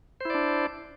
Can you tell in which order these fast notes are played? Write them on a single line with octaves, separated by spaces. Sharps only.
C5 E4 D5 D4